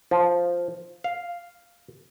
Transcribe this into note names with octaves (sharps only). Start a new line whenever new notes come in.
F3
F5